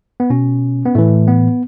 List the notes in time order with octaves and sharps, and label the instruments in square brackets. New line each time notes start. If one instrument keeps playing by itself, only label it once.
[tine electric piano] B3
B2 C#4
B3
A2 E3 A3
B3